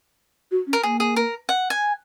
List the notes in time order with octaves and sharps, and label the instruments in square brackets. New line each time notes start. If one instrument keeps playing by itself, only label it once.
[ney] F#4
C#4
[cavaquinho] A#4
[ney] A#3 [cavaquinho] G#4
[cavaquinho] G#4
A#4
F#5
G#5